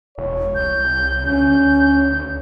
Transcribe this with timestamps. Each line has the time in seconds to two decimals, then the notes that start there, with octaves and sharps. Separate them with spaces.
0.18 E1 C#5
0.55 C2 G6
1.26 D2 C#4 G6